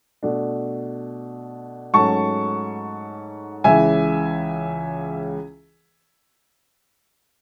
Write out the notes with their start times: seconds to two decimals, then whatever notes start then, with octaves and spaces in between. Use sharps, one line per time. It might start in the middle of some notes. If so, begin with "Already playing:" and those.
0.23 B2 A3 D4
1.94 G#2 F#3 A3 C#4 A5 C#6
3.64 C#2 C#3 E3 E5 G#5